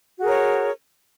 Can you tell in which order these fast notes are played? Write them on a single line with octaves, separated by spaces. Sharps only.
F#4 G#4 A#4 C#5